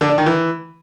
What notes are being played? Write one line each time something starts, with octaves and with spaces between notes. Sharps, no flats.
D3
D4
D#3
E3